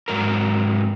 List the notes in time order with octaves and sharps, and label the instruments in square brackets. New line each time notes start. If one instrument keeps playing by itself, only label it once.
[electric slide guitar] G#2 F#3 A#4